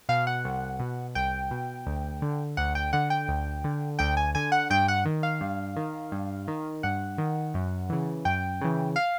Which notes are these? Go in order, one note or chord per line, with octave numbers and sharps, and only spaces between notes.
B2 F5
F#5
C2
B2
C2 G5
B2
D2
D3
D2 F#5
G5
D3 F#5
G5
D2
D3
D2 G5
G#5
D3 G#5
F#5
G2 G5
F#5
D#3
F5
G2
D#3
G2
D#3
G2 F#5
D#3
F#2
C#3 E3
F#2 G5
C#3 E3
F5